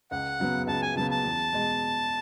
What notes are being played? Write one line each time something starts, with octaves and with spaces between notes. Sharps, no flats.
C#2 F#5
C#3 F#3 B3
C#2 A5
G#5
C#3 F#3 B3 A5
A5
E2
B2 G#3